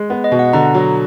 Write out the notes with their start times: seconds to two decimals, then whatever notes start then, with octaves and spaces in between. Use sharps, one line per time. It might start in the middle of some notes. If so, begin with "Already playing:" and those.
Already playing: G#3
0.10 B3
0.24 D#5
0.32 B2
0.39 F#5
0.53 D3 A#5
0.75 F#3